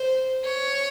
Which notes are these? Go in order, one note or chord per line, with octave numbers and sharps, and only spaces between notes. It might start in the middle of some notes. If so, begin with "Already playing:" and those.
Already playing: C5
C#5